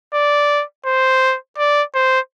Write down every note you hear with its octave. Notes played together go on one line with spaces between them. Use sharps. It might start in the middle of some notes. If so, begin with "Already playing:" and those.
D5
C5
D5
C5